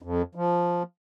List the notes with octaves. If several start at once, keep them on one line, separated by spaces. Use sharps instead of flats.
F2
F3